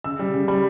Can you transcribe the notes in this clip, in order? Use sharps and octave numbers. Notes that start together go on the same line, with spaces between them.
C#3 E6
G3
C#3
G3 B5